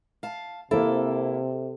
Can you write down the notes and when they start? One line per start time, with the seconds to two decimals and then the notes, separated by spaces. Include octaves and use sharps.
0.23 F5 A5
0.71 C3 A#3 C4 E4 A4